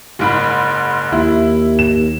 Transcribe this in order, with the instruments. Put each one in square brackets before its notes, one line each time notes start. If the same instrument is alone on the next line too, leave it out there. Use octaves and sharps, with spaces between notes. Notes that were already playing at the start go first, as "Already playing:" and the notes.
[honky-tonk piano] F#1 G#2 B5
[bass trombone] D#2 [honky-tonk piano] E4
[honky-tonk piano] E7